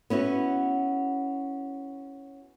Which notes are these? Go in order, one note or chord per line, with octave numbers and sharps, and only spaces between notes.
B3 C#4 E4 F#4